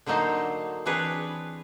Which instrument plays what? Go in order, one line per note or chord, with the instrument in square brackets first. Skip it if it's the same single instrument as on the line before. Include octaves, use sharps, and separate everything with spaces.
[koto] D3 F#3 A#3 D#4 A4 C5
E3 C4 D4 G#4 B4 C#5